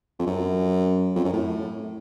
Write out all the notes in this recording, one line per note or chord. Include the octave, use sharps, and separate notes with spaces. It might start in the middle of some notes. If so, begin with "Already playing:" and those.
F2
F#2
F2
F#2
A2